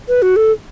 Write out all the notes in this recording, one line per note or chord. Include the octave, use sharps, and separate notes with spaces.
B4
F#4
A4